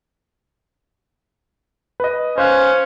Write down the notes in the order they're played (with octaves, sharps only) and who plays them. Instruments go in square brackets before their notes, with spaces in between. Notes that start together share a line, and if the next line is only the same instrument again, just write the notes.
[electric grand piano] B4 D#5
[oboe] C#4 [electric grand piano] C5 F5 F#6